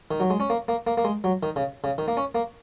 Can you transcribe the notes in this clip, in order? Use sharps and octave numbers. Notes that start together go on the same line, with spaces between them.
D#3
F#3
G#3
C#4
A#3
A#3
A#3
A#3
G#3
F#3
D#3
C#3
C#3
D#3
A#3
C#4
A#3